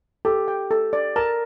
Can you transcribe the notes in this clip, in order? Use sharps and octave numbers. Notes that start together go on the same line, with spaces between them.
G4 A4
G5
A4
D5
A#4 A5